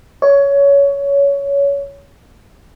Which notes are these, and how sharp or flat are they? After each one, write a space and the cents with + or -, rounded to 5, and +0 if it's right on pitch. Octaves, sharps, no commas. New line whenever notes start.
C#5 +20